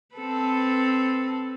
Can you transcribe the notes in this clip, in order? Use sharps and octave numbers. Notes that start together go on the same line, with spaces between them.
C4 A4 B4